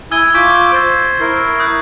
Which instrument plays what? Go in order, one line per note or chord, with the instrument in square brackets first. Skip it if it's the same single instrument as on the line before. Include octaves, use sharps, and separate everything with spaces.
[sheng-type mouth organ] E4 G#5 D#6 [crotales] E6 G#6 G7
[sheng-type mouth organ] F4 D6 G6 [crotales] C#6 G#6 B6
[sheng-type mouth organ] C5 [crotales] E6 A6
[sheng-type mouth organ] E4 A#4 [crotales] C7
[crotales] D#6 F#6 G6